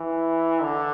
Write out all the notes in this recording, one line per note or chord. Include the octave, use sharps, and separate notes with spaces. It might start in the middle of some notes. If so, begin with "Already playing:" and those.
Already playing: E3
D3